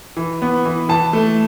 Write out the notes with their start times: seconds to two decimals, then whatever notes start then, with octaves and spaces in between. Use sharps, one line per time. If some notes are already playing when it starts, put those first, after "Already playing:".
0.17 E3
0.42 B3
0.65 E3
0.89 E3 A5
1.13 A3